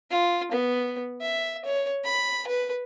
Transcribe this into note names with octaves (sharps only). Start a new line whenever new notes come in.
F4
B3
E5
C#5
B5
B4